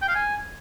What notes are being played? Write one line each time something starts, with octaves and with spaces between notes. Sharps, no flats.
G5
F5
G#5